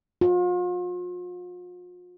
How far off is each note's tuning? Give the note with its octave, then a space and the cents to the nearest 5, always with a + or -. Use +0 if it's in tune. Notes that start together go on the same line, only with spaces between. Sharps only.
F4 +40